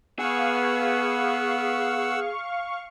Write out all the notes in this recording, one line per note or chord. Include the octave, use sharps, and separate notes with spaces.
B3 G#4 F5 F#5 C#6 E6